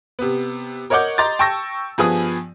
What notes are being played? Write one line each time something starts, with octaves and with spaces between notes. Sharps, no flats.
C3 B3
A#4 C#5 D#5 F#5 D6 G6
D#5 A#5 C6 D6 A6
G5 A5 C#6 E6 A#6
G2 F3 B3 G#4 G#5 D#6